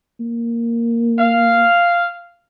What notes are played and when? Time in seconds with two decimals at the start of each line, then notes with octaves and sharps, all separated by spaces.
0.20 A#3
1.19 F5